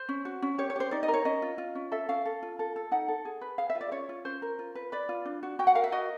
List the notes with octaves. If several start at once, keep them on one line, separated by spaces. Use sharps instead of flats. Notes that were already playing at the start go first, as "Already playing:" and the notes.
Already playing: C5
C#4
F#4
C#4
G4 C#5
C#5
G4 C5
D#4 D5
D#5
A#4
C#5
C#4 D#5
F4
F4
C#4
A4 E5
C#4 F5
A4
F4
A4
A4
D#4 F#5
A4
G#4
B4
G#4 F5
E5
F4
D5
C#4 C#5
F4
C#4 C5
A#4
F4
B4
B4 D5
F4
D4
F#4
F#4 G5
F#5
A#4 F5
E5
F#4 D#5